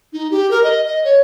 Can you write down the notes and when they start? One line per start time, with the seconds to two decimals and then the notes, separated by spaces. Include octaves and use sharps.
0.13 D#4
0.31 G4
0.51 A#4
0.64 D#5
0.86 D#5
1.05 C#5